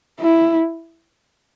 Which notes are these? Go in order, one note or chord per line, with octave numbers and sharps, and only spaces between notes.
E4